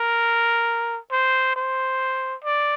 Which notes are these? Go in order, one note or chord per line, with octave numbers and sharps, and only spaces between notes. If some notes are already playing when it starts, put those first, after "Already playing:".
Already playing: A#4
C5
C5
D5